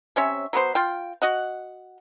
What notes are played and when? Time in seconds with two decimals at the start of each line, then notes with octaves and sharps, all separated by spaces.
0.16 C3 C#4 C#5 E5
0.53 F#3 B3 C5
0.75 F4 F5 G5
1.22 F#4 D#5 F#5